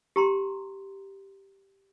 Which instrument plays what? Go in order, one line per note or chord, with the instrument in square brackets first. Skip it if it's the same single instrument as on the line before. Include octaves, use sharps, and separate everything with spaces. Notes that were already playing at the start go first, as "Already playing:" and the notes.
[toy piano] G4 A#5 C6